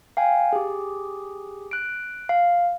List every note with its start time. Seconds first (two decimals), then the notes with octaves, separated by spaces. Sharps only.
0.17 F5 G5 G#5
0.53 G4 G#4
1.71 F#6 D7
2.29 F5